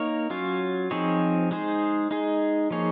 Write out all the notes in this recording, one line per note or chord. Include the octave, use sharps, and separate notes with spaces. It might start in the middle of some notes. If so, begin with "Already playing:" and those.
Already playing: A#3 D#4 A#4 C#5
F#3 C#4 F4
F3 C4 D#4 G#4 C#5
G#3 D#4 G#4 C5
G#3 D#4 G#4
F3 A#3 D#4 G#4 C#5